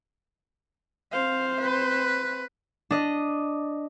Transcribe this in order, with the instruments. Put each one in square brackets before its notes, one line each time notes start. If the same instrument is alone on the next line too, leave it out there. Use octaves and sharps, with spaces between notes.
[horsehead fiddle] C4 C5 [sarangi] F5
[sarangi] B4
[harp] D4 D#5